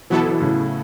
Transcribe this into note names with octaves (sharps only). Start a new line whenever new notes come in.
B2 E3 F#3 B3 E4 A4
B2 E3
A2 C#3